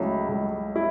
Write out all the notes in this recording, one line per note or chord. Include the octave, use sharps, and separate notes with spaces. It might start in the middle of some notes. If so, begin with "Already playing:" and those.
Already playing: C#2 C#3 F#3 A3 E4
C#2
E4